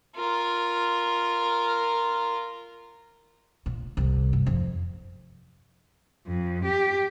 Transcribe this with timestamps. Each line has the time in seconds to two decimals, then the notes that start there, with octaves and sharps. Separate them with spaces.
0.16 F4 A#4
3.66 A#2
3.97 C2
4.33 G2
4.46 F2
6.27 F2
6.65 G4